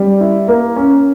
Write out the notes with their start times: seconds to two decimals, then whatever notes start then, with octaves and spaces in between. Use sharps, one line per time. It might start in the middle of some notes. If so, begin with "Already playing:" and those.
Already playing: G3
0.21 E4
0.48 A#3
0.76 C#4